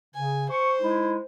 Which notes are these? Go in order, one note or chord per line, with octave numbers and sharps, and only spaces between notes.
C#3 G#5
C5 C#6
G#3 D#4 E4